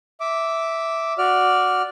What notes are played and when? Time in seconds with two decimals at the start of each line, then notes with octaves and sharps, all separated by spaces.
0.20 E5 D6
1.18 F#4 D5 F6